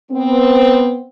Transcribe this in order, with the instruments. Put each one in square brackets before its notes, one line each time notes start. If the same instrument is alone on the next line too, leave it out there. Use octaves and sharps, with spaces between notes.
[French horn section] B3 C4